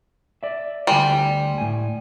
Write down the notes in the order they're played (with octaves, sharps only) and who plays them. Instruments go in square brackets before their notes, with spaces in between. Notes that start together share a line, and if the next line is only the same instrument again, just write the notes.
[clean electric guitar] D5 E5
[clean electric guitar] D2 G#5 C6 [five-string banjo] G3
[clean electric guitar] A2 G#5